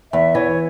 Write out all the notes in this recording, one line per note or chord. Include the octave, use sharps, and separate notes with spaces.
E2 E5
E3 C#5